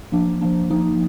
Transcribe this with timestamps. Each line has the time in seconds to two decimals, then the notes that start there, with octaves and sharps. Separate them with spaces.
0.12 F3 A#3 D4
0.41 F3 A#3 D4
0.70 F3 A#3 D#4